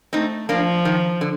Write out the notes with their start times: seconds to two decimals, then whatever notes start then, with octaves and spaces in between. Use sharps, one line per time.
0.13 A3 C4 D#4
0.49 F3 A#3 D4
0.85 D#3
1.21 D3